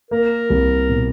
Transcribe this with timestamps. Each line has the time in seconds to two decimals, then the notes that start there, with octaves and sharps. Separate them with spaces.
0.11 A#3 A#4
0.50 C2
0.89 B2